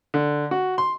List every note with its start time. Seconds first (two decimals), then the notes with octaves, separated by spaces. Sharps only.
0.14 D3
0.51 F#4
0.78 C6